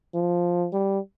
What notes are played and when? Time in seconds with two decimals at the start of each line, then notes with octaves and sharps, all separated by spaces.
0.15 F3
0.73 G3